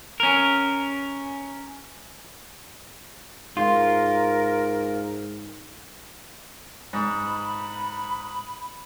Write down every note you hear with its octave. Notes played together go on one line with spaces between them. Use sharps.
C#4 A#4
G#2 F4 A#4
G#2 B5